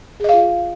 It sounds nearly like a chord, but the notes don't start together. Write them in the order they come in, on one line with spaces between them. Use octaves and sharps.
G#4 D#5 F5 F4